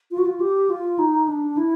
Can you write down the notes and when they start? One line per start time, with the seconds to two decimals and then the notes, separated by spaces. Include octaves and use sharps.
0.11 F4
0.18 F#4
0.25 F4
0.40 G4
0.70 F4
0.99 D#4
1.28 D4
1.57 E4